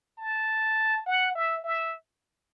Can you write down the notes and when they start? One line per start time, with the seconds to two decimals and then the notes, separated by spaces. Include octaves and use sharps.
0.19 A5
1.06 F#5
1.35 E5
1.64 E5